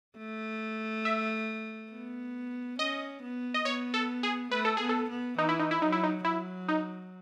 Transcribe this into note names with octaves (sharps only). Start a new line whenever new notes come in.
A3
E5
B3
C#4 D#5
B3
D#5
B3 C#5
A4
G#4
A3 B4
A4
B3 G#4
A4
B3
E3 D#4
E4
D#4
E4
F#3 D#4
E4
D#4
F#3 E4
D#4